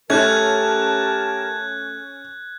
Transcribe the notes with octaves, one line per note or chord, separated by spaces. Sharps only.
A3 C#4 G4 A#4 A5 F#6 G#6